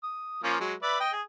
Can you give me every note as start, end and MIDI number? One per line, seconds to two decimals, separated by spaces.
0.03 0.42 87
0.44 0.56 53
0.44 0.56 58
0.44 0.56 61
0.60 0.74 54
0.60 0.74 56
0.83 0.99 71
0.83 0.99 74
0.83 0.99 76
1.00 1.12 75
1.00 1.12 79
1.13 1.22 68